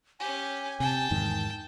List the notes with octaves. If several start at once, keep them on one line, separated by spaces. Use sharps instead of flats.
C#4 G4 G#5
C3 G5 A5
E2 G#2 D#3